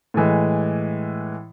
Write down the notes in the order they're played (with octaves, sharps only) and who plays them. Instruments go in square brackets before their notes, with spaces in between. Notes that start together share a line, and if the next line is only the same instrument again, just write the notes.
[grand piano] A2 E3 G#3